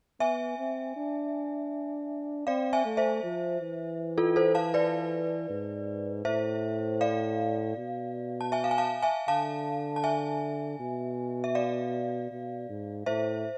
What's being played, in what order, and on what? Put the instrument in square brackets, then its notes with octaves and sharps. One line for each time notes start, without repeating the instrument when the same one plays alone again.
[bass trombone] B3 [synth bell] E5 G#5
[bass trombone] C4
D4
[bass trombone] C4 [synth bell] D5 F5
[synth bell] E5 G#5
[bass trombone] A3
[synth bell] C5 E5
[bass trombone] F3
E3
[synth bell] F4 A4
A4 C5
F5 A5
B4 D5
[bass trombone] G#2
[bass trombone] A2 [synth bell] C5 E5
[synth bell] D5 F5
[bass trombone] B2
[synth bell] A5
E5 G#5
F5
G#5
F5 A5
E5 G#5
[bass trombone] D3 [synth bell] F5 A5
[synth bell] A5
E5 G#5
[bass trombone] B2
[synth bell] E5
D5 F5
[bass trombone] B2
G#2
[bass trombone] A2 [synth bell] C5 E5